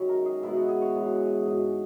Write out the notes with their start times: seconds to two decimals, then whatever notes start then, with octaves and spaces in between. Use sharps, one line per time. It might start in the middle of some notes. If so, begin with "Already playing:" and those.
Already playing: F#2 D#3 G#3 C#4 C#5
0.09 A#4
0.26 G#4
0.43 B2 G#3 B3 E4
0.56 F#4
0.68 G#4
0.82 C#5
0.95 F#2 E3 G#3
1.46 G#2 F#3 C#4